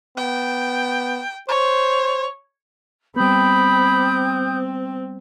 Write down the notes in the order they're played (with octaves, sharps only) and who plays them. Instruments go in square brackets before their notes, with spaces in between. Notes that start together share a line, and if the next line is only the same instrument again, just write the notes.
[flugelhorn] B3 [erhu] G5
[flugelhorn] C5 [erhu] C#5
[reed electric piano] G3 B3 [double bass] C4 [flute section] G5 D#6 G6 [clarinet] B5